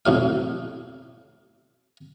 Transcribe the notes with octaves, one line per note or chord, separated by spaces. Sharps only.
B1 F2 A2 F5